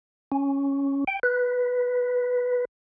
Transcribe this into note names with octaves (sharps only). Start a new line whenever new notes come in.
C#4
G5
B4